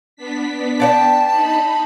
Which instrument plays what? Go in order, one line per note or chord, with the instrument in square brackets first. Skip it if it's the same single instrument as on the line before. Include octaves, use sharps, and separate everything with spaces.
[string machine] B3 D4 B6
[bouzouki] D5 F#5 G5 [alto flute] A5
[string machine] D#4 B5